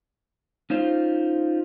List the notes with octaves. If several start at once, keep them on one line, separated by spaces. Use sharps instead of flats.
C#4 D#4 F4 C5